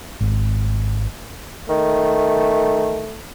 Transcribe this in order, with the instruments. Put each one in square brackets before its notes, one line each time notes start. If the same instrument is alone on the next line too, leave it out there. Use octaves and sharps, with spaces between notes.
[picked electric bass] G#1
[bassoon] D#3 [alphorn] A3